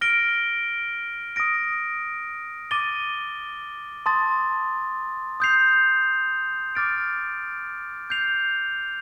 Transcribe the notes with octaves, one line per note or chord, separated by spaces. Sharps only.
F6 A#6 D7 G7
D#6 A#6 D7
D6 A6 D#7 G7
A5 C6 D#6 A6
D#6 G6 C7 F7
D6 F6 A6 D7
G6 C7 F7